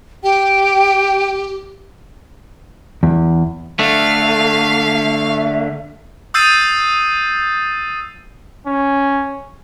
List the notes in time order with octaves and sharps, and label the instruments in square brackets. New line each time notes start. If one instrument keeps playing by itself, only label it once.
[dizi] G4 [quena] G5
[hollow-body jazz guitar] E2
[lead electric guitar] D3 A3 [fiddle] F5
[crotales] D#6 E6 G6 A6 C7 D#7
[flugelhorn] C#4